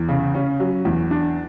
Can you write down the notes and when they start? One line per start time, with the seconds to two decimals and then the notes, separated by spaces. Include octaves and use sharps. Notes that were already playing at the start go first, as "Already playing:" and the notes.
Already playing: E2
0.08 C#3
0.34 C#4
0.60 F#3
0.85 E2
1.11 D4